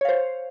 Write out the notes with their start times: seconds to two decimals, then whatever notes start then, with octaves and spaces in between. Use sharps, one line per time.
0.01 C#5
0.05 F5
0.09 C5